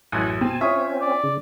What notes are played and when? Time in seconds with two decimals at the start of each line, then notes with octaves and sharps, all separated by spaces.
0.12 A1 F#2 F#5 G#5
0.41 B2 C4 G#5 A5
0.61 C4 C#4 F4 C#5 E5 D#6
1.01 D5
1.24 C#3